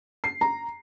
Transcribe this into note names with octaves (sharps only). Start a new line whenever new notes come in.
C7
A#5